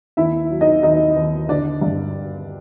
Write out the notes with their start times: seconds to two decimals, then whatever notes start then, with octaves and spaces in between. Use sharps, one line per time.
0.17 D#2 E4 E5
0.50 F#3
0.61 D#4 D#5
0.83 D#2 D#4 D#5
1.16 D#2
1.49 D3 D4 D5
1.81 G2